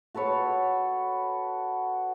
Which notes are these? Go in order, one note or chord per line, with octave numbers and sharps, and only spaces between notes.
F#4 A4 B4 C#5